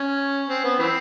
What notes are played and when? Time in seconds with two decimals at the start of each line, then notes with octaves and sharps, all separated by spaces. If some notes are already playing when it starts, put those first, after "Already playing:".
Already playing: C#4
0.49 C4
0.64 B3
0.79 E3 C4